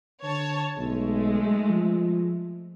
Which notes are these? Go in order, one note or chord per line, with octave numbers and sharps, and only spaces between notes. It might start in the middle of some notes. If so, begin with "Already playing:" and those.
D3 C#5 A5
B1 G#3 A3
F3